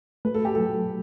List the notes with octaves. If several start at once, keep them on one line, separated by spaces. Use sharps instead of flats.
A3 B4
A4
G4
F#3 A4